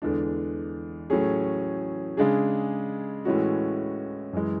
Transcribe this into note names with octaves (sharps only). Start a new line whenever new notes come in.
E2 D3 G#3 D4
A2 F#3 A3 C#4 G#4
C#3 G#3 D4 G#4
A2 E3 G#3 C#4 F#4
F#2 E3 G#3